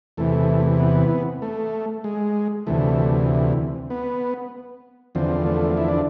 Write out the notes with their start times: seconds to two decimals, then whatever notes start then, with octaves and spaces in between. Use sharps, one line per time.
0.17 E2 C3 E3 A3
0.80 B3
1.42 A3
2.04 G#3
2.67 D2 C3 E3 A3
3.90 B3
5.15 E2 D3 F3 C4
5.46 A3
5.77 E4
5.88 D4